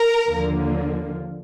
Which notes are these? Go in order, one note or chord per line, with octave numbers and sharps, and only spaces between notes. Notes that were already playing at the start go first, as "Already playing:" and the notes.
Already playing: A#4
D#2 D3 F3 A#3